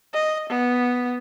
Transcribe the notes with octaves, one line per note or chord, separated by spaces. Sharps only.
D#5
B3